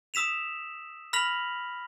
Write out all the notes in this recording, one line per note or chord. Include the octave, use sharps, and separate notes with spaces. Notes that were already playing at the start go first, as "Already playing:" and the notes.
D#6 E6 B6 E7 F7
B5 F6 A#6 B6 F7 F#7